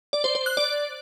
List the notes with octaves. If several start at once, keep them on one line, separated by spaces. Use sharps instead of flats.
D5
C5
C5
F#6
D5